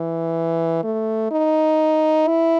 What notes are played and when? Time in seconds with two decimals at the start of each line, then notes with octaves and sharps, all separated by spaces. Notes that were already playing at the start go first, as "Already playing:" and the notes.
Already playing: E3
0.84 A3
1.31 D#4
2.27 E4